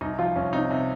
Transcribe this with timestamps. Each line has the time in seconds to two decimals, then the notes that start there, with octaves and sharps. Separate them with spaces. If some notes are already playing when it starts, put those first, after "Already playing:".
0.01 C2 D#4
0.19 F3 F4
0.36 C2 C#4
0.53 C3 D#4
0.71 C3